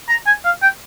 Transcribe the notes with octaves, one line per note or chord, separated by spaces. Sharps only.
A#5
G#5
F5
G5